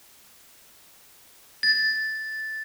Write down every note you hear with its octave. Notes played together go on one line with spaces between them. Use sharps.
A6